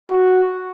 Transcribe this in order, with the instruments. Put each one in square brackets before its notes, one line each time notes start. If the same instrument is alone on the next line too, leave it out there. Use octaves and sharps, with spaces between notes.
[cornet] F#4